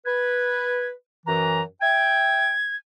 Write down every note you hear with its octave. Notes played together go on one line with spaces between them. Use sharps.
B4 G#6
F#2 E3 A#5
E5 G5 G#6